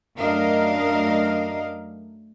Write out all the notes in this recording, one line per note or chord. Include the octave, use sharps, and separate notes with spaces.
F#2 A3 D4 A#4 D#5 F5